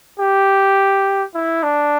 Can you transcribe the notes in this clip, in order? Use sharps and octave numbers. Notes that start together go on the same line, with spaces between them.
G4
E4
D4